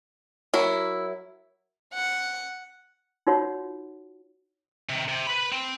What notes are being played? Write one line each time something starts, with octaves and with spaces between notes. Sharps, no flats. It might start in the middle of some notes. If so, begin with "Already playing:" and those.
F#3 E4 A#4
F#5
D#4 F4 F#4 C#5 F#5
C3 D#3
C3
B4 B5
C4